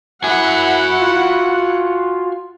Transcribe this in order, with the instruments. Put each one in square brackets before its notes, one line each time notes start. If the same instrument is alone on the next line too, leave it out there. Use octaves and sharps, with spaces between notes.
[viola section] E4 F#5 [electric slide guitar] F#4 G#5 [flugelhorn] E5
[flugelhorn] F4